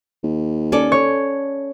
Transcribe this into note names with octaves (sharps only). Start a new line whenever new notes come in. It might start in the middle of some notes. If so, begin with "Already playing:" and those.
D#2
C#4 A4 D5
C#5